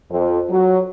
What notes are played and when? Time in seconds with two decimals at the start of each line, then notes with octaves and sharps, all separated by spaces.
0.11 F2
0.49 F#3